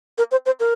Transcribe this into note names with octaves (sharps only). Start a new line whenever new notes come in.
A#4
C5
C5
A#4